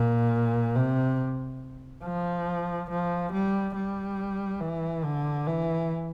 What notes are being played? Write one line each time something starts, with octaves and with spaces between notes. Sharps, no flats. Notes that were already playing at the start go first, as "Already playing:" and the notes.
Already playing: A#2
C3
F3
F3
G3
G3
E3
D3
E3